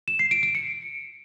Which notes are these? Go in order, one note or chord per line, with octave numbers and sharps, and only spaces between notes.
E7
C7
D7
D7
C#7